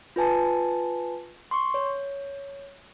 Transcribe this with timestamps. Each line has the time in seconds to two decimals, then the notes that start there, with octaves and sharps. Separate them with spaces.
0.16 F4 B4 G#5 A5
1.51 C6 C#6
1.74 C#5